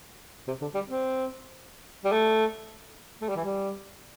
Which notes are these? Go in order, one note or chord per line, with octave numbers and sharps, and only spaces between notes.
C3
D3
G3
C4
G3
A3
A3
G3
E3
G3